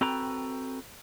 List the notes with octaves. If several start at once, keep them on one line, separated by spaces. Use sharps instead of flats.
C4 F#4 A4 B4 G5 A#5